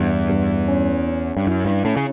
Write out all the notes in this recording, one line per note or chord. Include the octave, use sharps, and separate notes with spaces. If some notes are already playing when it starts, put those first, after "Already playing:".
Already playing: E2 G2
G2
C#4
C#4
G2
F#2 E4
G2
A2 C#4
C#3